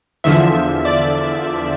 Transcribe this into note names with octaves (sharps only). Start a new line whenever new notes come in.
E2 D3 F3 E5
D5